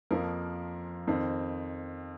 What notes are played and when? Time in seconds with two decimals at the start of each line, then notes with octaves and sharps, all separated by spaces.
0.11 F2 F3 A#3 A#4
1.08 F2 D#3 C4